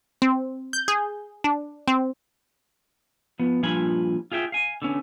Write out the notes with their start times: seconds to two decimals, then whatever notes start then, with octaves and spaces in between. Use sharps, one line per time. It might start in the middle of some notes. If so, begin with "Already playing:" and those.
0.22 C4
0.73 G6
0.88 G#4
1.44 D4
1.88 C4
3.39 F3 B3
3.63 G2 A#2 F3 F4 G#5 B5
4.32 F4 G#4 E5 G5
4.52 F5 G#5
4.82 D3 B3 C#4